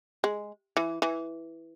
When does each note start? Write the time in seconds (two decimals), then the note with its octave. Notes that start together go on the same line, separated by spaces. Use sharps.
0.24 G#3
0.77 E3
1.02 E3